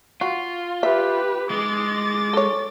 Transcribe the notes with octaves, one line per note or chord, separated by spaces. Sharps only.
F4 F#4
G4 B4 E5
G#3 D6 A6
A4 C#5